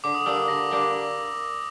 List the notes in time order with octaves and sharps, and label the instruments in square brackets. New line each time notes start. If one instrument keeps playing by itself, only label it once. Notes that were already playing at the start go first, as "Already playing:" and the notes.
[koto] D3 [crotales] D6
[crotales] D#6
[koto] G3 A#3 D4 [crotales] E6
[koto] D3 [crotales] A#6
[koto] G3 A#3 D4